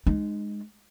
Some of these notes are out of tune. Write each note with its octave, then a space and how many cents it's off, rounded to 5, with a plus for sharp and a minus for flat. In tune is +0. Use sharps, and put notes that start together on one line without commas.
G#3 +0 D#4 -30